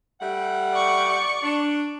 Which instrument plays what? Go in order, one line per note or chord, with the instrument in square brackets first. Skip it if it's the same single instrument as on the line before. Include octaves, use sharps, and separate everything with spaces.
[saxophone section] G3 A3 F#5
[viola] D5 C#6
[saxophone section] D4